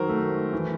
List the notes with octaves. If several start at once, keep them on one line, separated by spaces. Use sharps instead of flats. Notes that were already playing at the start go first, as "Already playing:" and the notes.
Already playing: D#3 F#3 A#4 C5
A3
E3